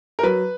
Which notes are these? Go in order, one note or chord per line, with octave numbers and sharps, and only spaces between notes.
A#4
F#3 B4